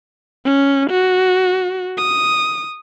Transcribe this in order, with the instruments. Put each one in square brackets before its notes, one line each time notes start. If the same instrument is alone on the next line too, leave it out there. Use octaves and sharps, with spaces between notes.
[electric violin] C#4
F#4
D#6